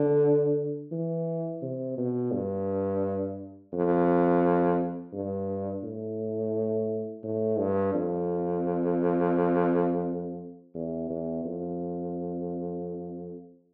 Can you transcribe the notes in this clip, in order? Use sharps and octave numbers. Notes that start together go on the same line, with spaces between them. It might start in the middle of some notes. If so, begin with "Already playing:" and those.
Already playing: D3
E3
C3
B2
G2
F2
G2
A2
A2
G2
F2
E2
E2
F2